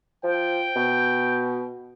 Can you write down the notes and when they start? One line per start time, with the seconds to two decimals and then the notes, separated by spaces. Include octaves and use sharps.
0.24 F3 G5
0.76 B2